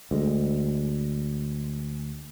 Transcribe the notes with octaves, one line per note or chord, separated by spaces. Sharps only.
D2 G#3